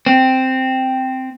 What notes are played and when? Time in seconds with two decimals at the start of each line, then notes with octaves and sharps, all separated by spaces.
0.06 C4